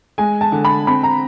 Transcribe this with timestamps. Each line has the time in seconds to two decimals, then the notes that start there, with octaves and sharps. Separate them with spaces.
0.18 G#3 G#5
0.41 A5
0.52 D3
0.65 B5
0.87 C4 B5
1.03 A#5